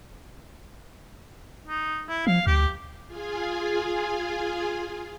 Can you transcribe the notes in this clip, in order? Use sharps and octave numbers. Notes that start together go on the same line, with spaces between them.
D#4
E4
F3 F5
D2 G4
F4 G#4 G#5